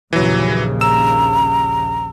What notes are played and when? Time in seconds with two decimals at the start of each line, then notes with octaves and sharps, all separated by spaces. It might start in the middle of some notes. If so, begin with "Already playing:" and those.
0.13 A#1 D#2 C#3 E3 F#3
0.81 A#5 E6 E7